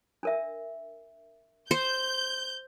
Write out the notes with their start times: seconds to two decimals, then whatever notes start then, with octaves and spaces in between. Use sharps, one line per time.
0.23 D4 A#4 E5
1.71 C5 G6